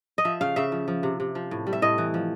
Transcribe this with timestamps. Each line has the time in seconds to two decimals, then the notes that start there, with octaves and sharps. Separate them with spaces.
0.18 D#5
0.25 F3 E5
0.41 C#3 F5
0.56 C#3 E5
0.72 F3
0.88 F3
1.03 C3
1.20 C3
1.35 F3
1.51 A2
1.67 G3
1.73 E5
1.82 A2 D#5
1.98 E3
2.14 F3